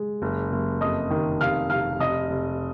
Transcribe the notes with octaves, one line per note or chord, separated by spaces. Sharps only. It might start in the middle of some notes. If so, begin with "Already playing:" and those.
Already playing: G#3
F#1
F#1
F2 D#5 D#6
D#3
F1 F5 F6
F1 F5 F6
F1 D#5 D#6
F1